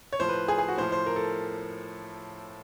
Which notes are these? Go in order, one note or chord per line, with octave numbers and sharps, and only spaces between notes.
C#5
A2 F3 C5
B4
G#4
G#4
F#4
A2 F3 C5
C5
A#4
A4